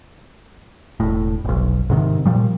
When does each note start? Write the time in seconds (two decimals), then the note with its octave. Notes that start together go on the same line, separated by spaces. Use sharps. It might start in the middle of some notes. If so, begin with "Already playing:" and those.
1.00 E1 A2
1.45 F1 B1
1.90 G#2 C3 D#3
2.26 A#2 F3 G3